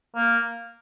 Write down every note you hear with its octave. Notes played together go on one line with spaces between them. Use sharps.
A#3